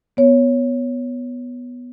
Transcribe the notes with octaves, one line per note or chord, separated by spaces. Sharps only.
B3 C#5